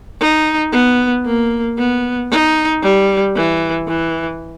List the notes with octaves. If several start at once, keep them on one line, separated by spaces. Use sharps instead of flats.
D#4
B3
A#3
B3
D#4
G3
E3
E3